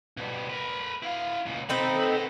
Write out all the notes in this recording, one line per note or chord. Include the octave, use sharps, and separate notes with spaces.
B2 G3
A#4 B4
E4 F5
C#2 A#2
D#3 C4 D#4 A4 B5
B4 D#5